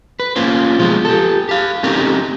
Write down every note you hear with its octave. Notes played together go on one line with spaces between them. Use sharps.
B4
A#3 C#4 F4 C5
B2 F3 G#3 F4
G4 A4
G4 F5
A3 C4 C#4 D#4 G4 A#4